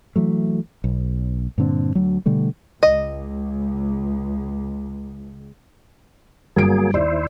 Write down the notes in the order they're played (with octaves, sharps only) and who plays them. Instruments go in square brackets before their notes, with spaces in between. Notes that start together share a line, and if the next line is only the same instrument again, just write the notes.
[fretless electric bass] E3 F#3 A3
B1
G2 A#2 D3 C4
D2 F#3
B2 D3 G3 A3
[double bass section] C#2 [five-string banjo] D#5
[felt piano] G1 D7 [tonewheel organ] F#3 A#3 G#4
[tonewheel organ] D#2 E4 C5 [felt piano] D5